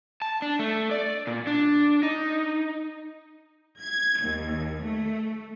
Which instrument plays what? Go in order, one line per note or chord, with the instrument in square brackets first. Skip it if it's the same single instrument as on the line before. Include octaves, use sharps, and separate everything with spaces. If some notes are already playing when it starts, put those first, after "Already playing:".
[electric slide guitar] A5
D4
A3
D5
A#2
D4
D#4
[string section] G#6
D#2
A3